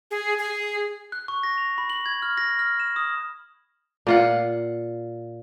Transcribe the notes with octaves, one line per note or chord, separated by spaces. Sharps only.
G#4
G#4
F#6
C#6
A#6
F7
B5
F#7
G#6
F6
A#6
F6
E7
D#6
A#2 F4 F#5